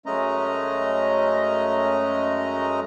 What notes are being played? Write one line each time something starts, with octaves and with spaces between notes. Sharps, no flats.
F#2 G#3 A3 C#4 D#5 A#5